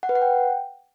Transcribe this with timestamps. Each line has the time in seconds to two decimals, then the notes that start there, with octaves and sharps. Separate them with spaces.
0.03 F#5
0.09 B4
0.15 F#5
0.22 G5